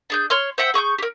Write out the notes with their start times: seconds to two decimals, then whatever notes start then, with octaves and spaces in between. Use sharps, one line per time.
0.10 D4 G#4 G6
0.30 C#5 C6 F6
0.58 C5 E5 F#5 G5
0.74 G#4 C#6 D#6 G6
0.98 G4 A#4